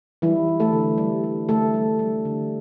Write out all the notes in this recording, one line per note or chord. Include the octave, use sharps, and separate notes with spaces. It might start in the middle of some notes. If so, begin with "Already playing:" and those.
E3 G3 E4
G3
A3 A4
D3
G3
G3
D3 A3 A4
G3
G3
D3